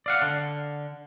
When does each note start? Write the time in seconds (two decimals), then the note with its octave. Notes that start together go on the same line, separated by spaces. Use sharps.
0.06 D5 F5 F#5
0.22 D3